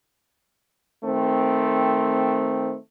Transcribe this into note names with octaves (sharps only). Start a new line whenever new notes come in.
D#3 A3 C4